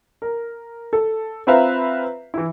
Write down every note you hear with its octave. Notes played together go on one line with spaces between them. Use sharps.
A#4
A4
C4 F4 B4 E5 F5 A#5
E3 E4